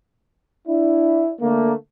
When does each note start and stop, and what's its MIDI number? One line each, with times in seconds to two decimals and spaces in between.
0.68 1.31 62
0.68 1.31 64
1.41 1.73 50
1.41 1.73 57
1.41 1.73 58